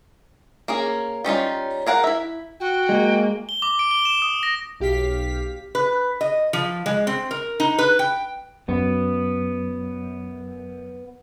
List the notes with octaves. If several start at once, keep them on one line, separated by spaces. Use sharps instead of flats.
A#3 C#4 G#4
G3 C#4 D#4 F4
G#4 A#4 F5 F#5
E4 E5
F#4 G5
G#3 A#3
G7
D6
D7
G7
E7
D#6
A#6
B1 G4 F5 B6
B4
D#5
F3
G#3
C4
A#4
D#4
B4
G5
F#2 B3